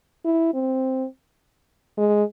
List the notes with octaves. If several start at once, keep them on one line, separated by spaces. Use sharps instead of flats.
E4
C4
G#3